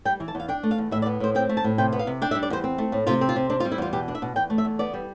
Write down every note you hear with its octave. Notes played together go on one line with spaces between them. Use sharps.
G3 G5
E3
A5
E2 F5
D4 G5
A3
F5
E2
A2 E5
D5
B3
A2 C5
C4 G5
A3
A5
A2
C3 G5
B3
F5
C3
D4 G5
E5
G3
D5
E2 C5
C4
A3
A2
C3 F4
C4
F4
C3
C4 D4
F4
G3
E4
E2 F4
B2 G4
D4
E5
B2
E2 G5
A3
E5
E2
B3 D5
G3